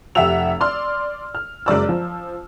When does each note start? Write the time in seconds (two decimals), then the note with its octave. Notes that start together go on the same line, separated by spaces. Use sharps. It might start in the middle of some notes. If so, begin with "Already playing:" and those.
0.15 F1 G4 E5 F#5 E6 F7
0.61 D5 C6 F6
1.35 F6
1.66 F#1 G#3 D5 E6
1.89 F3